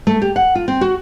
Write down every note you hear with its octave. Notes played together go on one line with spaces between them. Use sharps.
A3
G4
F#5
F4
C4
F#4